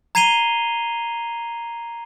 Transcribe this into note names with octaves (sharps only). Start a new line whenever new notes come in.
A#5 G#6 C7 D#7 F7 G7